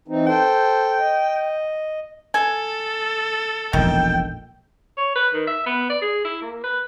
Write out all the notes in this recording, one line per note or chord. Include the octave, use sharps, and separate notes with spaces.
E3 C4 D#4
A4 C5 G5
D#5
A4 G#5
E1 A#1 D#3 G5
C#5
B4
D#3
E5
B3
D5
G#4
E4
A#3
B4